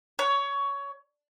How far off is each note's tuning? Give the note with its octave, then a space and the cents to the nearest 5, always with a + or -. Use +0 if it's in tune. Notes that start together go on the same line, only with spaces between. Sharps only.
C#5 +15